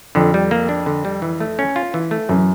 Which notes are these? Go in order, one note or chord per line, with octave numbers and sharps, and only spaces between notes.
F2 D3
G3
A#3
D4
D3
G3
E3
A3
C#4
F4
E3
A3
F#2 E3